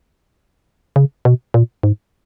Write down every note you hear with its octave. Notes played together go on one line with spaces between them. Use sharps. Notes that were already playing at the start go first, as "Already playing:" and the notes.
C#3
B2
A#2
G#2